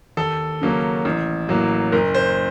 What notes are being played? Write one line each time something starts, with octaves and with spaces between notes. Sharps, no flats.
D#2 A4
C#3 F#3 A#3 C#4
A1
A2 F#3 A#3
F#1 A#4
C5